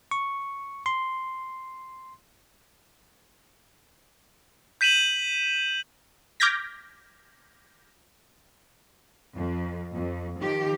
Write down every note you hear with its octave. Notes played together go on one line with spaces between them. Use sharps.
C#6
C6
G6 B6 D#7 E7 F#7
D6 F6 G6 G#6 A#6 B6
F2
F2
D#3 F3 G4